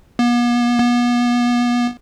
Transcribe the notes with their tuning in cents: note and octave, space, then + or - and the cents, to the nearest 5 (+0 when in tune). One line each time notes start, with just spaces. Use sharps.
B3 -45
B3 -35